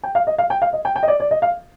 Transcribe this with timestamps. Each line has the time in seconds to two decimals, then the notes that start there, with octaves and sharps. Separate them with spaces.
0.03 G5
0.15 F5
0.27 D#5
0.38 F5
0.50 G5
0.62 F5
0.73 D#5
0.85 G5
0.96 G5
1.03 D#5
1.08 D5
1.20 D5
1.31 D#5
1.42 F5